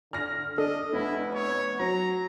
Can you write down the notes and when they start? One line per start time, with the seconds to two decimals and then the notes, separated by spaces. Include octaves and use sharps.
0.13 D3 F6 A#6
0.58 D4 A4 D#5
0.93 F1 B3 E4
1.34 C#5
1.80 F#3 A#5